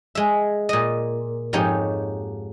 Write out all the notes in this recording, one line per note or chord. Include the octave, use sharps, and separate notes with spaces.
G#3 E5
A#2 D#5
F2 G#2 D#4 G4 C#5